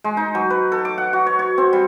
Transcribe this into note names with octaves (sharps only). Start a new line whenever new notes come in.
G#3
D#4
F#3
B4
A4
D6
F#5
F#4
C#5
C#5
C4
G3